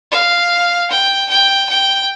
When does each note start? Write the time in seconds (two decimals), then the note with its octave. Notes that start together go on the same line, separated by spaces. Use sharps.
0.11 F5
0.90 G5
1.29 G5
1.69 G5